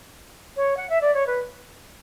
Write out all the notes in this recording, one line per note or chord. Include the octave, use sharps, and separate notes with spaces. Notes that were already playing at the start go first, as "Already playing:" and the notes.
C#5
F#5
E5
D5
C#5
B4